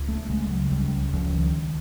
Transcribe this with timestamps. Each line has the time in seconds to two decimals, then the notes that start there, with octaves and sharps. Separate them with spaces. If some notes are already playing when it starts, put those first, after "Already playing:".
Already playing: C#2
0.08 A3
0.30 C#3 G#3
0.50 F#3
0.71 C#2 G3
1.13 C#2 F3
1.34 D#3